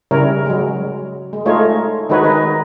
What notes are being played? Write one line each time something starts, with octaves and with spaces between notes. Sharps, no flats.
C#3 G3 E4 A#4 C#5
F#3 G#3
G#3
G#3 A3 D#4 F4 C#5
D#3 G#3 D#4 F#4 B4 C#5
D#4 B4